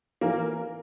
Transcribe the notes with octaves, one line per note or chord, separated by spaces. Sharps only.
E3 A#3 A#4